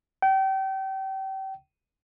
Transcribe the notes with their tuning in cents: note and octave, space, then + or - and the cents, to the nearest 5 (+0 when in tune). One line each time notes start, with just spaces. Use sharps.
G5 -30